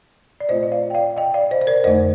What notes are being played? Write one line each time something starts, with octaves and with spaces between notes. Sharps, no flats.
D5
A#2 A3 C4 F4 C5 D#5
D#5
D5 F5
G5
D5 F5
D#5 G5
D5 F5
C5 D#5
C5
A#4 D5
F2 D3 A3 D#4 C5 D#5